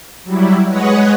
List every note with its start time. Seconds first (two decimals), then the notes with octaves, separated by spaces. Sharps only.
0.24 F#3 G3 E4
0.68 G#3 B4 C#5 D#5 F#5